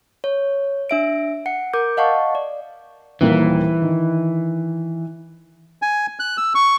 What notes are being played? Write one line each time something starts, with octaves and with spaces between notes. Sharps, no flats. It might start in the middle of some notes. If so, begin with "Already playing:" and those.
C#5
D4 E5 D7
F#5 C#7
A#4 D6 G6
D#5 F5 F#5 A5 C#6
D5
D#1 D#2 E3 A#3
D#3
G#5
F#6
E6
C#6